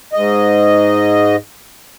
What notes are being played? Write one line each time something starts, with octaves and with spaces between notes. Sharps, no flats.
G#2 D#5